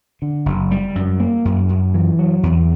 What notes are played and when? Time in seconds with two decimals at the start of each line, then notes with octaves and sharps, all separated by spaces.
0.22 D3
0.46 F#1
0.71 G3
0.95 F#2
1.20 A#3
1.45 F#2
1.69 F#2
1.94 E3
2.19 F#3
2.43 E2